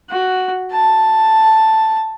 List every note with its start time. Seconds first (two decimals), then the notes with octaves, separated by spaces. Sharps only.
0.10 F#4
0.73 A5